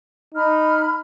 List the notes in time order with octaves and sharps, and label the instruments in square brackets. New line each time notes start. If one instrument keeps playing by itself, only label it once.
[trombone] D#4 [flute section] B5 F6